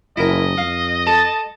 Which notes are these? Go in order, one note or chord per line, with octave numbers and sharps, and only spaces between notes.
F#1 E4 A#4 D#5
F2 F5
A4 A5